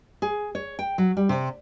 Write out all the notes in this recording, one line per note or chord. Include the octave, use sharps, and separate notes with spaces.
G#4
C#5
G5
F#3
G3
C3